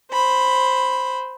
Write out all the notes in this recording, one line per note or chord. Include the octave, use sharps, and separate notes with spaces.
C5 B5